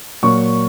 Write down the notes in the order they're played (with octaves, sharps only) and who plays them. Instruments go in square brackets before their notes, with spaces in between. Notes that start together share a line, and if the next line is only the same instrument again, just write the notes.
[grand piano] A#2 F#3 A#3 C#6